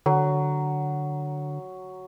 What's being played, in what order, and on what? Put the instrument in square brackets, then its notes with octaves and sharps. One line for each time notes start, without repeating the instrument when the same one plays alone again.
[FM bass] D3 [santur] F#3